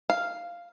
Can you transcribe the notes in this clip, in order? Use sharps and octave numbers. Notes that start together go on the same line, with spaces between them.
F5